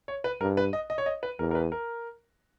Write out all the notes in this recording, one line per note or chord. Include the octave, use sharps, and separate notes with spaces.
C#5
B4
G2 A#4
B4
D#5
D#5
C#5
D#5
B4
E2 A#4
A#4
B4
A#4